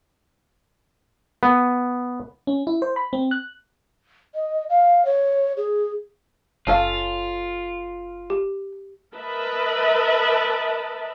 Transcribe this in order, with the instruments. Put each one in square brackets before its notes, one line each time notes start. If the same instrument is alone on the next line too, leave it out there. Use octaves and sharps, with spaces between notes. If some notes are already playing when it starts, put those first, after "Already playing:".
[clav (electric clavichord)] B3
[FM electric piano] C#4
E4
C5
B5
C4
F#6
[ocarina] D#5
F5
C#5
G#4
[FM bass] F#1 [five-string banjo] C#4 A4 F5 [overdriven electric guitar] F4
[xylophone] G4
[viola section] A#4 B4 D#5 E5 A5